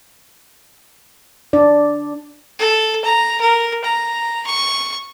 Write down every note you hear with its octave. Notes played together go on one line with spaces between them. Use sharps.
D4 D5
A4
A#5
A#4
A#5
C#6